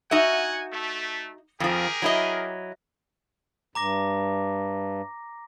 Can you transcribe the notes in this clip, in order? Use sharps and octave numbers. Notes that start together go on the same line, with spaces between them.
D#4 F#4 E5 F#5 G#5
A3
F2 F3 G4 G#4 A#4
F#3 E4 D#5
G2 A#5 D6 A#6